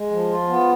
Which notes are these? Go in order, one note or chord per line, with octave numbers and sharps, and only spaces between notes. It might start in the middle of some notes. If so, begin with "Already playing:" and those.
Already playing: G#3
F3
F4
B3